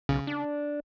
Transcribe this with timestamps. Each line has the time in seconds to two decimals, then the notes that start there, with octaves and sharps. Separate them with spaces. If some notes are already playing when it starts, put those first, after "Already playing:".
0.09 B1 C#3
0.27 D4